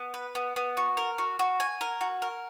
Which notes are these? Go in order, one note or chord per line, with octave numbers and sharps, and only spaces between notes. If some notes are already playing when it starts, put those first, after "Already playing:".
Already playing: B3
B4
B3
B3
F#4
A#4
F#4
F#4
G#5
A#4
F#4
A#4